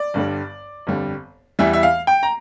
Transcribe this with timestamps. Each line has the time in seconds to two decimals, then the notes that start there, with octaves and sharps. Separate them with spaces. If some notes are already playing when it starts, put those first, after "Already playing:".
Already playing: D5
0.14 G1 G2 D3 G3
0.87 G1 F2 D3 G3
1.59 E2 E3 G3 E5
1.73 E5
1.83 F5
2.07 G5
2.23 A#5